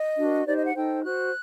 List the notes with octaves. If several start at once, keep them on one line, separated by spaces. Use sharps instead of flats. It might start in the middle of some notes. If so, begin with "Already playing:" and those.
Already playing: D#5
D4 F#4 A#4
D#4 G4 C5 D5
D#5
F#5
D#4 A4 C5 G5
F#4 C5 F#6